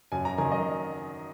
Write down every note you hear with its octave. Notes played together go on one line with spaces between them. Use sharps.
F#2 G#5
A#5
D#3 F#3 G#5
D#5